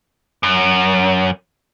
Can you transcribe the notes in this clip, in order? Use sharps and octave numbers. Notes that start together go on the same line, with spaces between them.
F#2